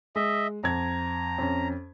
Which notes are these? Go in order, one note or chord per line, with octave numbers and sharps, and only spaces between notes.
G#3 D#5 E5
F2 A#5 G#6
F2 C#4